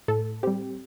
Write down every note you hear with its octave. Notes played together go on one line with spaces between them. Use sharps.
A2 A4
G3 C4 G4